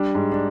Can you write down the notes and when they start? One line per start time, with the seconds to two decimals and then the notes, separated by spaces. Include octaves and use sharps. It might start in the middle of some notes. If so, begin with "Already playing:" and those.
Already playing: G3 D4
0.15 G#2
0.32 D4